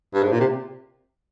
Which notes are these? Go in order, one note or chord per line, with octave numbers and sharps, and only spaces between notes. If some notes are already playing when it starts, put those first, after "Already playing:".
G2
G#2
A#2
C3